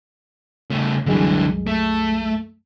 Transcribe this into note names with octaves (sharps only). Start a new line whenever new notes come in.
C#3 A3
C2 F#2 D3 E3 G#3
A3